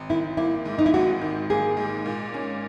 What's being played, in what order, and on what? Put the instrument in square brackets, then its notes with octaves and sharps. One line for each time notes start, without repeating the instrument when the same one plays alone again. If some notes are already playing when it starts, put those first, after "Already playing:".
Already playing: [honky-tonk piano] G#1
[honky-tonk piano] D#3 [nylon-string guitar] E4
[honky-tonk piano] A#3 [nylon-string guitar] E4
[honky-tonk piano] G#2
[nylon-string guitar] D#4
E4
[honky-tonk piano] G#1 [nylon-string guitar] F#4
[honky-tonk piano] D#3
[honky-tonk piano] A#3 [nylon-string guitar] G#4
[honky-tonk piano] G#2
A#2
C#4